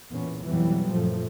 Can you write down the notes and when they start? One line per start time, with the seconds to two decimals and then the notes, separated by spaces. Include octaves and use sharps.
0.10 E2 A#2 B3 C#4
0.43 F2 B2 E3 F#3 G3 B3
0.91 F#2 A#2 F3 A3